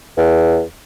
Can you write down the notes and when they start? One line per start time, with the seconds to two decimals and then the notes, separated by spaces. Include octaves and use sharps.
0.17 E2